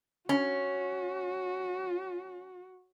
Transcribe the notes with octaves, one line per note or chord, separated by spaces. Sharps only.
C#4 F#4